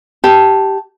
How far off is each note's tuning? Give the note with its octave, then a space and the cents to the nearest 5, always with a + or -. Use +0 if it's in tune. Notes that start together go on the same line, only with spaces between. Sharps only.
G4 -10 A5 +0